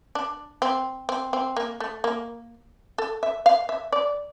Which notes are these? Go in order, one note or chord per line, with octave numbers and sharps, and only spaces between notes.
D4
C4
C4
C4
A#3
A3
A#3
A4
E5
F5
E5
D5